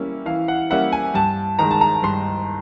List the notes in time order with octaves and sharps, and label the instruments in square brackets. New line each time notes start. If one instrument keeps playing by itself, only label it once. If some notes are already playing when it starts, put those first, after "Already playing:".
Already playing: [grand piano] E3 G3 A#3 C#4 E4
E3 F5
F#5
G3 A#3 C#4 E4 F#5
G#5
G2 A5
D#3 G#3 A#5
A5
A#5
G2 C6